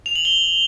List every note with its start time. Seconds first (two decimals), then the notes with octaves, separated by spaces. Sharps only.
0.06 F7
0.15 F#7
0.25 G7